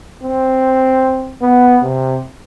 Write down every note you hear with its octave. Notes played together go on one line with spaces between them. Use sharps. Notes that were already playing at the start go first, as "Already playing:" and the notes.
C4
B3
C3